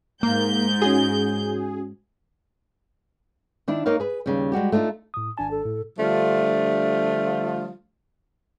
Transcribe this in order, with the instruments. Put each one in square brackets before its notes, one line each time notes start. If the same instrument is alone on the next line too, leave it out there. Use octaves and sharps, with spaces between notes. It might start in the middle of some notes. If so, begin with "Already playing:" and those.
[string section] G#2 G6 [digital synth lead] A#3
[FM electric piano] C#4 F#4 [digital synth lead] G#4
[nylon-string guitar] D#3 D4 E4
A#3 D#4 A#4 C#5 F5
G#4 B4
D#2 C#3 G3
G3 G#3 F#4 G4
A3 D4 D#4 F4
[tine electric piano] A2 D#6
[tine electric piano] G#1 D4 A5 [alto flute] G#5
[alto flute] A4
[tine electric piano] A2
[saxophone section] D3 F3 G3 A3 D4 F4